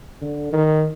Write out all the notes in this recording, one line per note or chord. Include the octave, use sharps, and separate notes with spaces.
D3
D#3